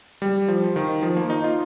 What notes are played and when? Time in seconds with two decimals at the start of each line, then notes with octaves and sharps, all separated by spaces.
0.22 G3
0.48 F3
0.76 D#3
1.03 F3
1.17 A#3
1.30 D#4
1.44 F4